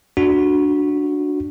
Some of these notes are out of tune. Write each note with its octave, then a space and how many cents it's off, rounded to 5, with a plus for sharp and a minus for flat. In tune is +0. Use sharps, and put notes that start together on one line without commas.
D4 +0 F#4 -10